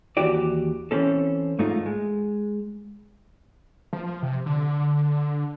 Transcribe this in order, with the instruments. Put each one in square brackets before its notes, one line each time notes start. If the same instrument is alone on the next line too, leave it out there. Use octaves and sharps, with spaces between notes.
[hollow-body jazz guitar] D#2 E3 F#4 G4 D5
E3 C4 C#4 A4
G#2 A3 D#4 F4
G#3
[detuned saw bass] F3
C3
D3